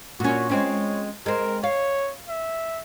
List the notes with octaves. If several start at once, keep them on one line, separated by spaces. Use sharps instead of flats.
A#2 C#4 F#4
G#3 C4 C#4 C#5
G#3 C4 A#4
C#5 F5
E5